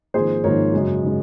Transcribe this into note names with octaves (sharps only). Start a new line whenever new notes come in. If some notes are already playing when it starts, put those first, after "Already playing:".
G#1 G#2 F3 A#3 G#4 C5
G#1 G#2 F3 A#3 A#4 C#5
F#2 C#3 G#3
C#3 G#3